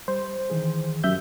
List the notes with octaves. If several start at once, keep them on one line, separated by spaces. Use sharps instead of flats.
G3 C5
D#3 E3 G#4
F#2 G4 E5 G6